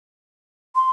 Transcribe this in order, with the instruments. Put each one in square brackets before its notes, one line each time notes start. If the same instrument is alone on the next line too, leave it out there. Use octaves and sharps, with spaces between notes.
[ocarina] C6